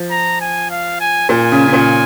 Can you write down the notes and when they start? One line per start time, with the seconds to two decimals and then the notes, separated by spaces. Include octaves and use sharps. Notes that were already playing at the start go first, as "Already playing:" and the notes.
Already playing: F3
0.11 A#5
0.41 G#5
0.71 F5
1.00 G#5
1.29 A#2 G#5
1.52 C#3
1.68 C#3
1.73 A#2